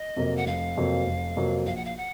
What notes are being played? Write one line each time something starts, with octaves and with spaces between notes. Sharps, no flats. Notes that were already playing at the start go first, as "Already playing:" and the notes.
Already playing: D#5
F2 C3 F#3 A#3
F#5
F1 F5
F2 C3 F#3 A#3
F1
F2 C3 F#3 A#3
A#1 F5
F#5
F5
F#5